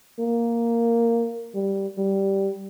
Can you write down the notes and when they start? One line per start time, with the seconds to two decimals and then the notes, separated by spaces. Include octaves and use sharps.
0.20 A#3
1.55 G3
1.98 G3